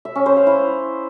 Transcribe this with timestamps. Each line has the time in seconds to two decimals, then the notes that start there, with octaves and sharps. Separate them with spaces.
0.05 E5
0.15 C#4
0.26 C5
0.36 F5
0.47 E4